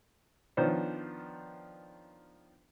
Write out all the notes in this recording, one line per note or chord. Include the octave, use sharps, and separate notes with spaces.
D#3 F3 B3 D4 C5 C#5